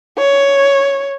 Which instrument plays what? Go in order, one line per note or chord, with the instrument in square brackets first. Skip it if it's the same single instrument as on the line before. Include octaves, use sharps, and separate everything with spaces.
[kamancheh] C#5